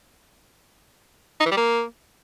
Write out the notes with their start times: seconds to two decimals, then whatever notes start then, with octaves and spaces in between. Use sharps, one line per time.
1.40 D#4
1.46 E3
1.51 G3
1.57 A#3